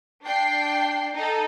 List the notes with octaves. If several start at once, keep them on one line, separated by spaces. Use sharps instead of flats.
D4 G5 C7
D#4 A4